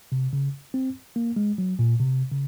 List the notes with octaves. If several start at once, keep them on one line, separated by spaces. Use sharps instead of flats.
C3
C#3
C4
A#3
G#3
F#3
A#2
C3
C#3